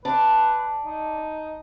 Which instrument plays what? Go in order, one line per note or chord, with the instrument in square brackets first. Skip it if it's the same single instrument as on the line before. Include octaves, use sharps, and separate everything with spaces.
[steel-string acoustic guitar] D4 [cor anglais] B4
[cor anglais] D#4